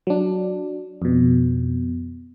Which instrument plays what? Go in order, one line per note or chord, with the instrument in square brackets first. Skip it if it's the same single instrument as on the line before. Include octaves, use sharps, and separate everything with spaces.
[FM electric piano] F#3 D4
F2 B2